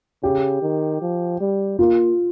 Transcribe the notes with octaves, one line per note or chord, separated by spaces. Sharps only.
C#3 G4
D#3
F3
G3
A#3 F4